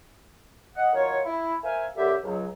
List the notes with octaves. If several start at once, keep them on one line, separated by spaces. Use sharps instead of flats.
D#5 F#5
D#3 F#3 F4 A#4 C#5
E4
A#4 C5 E5 F5 G#5
F#2 D3 G4 E5
C#2 F#3